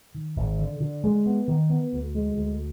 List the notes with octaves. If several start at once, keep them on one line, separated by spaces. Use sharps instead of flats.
D#3
G#1
D3
D3
G#3
B3
D#3
B3
D2
G#3
D2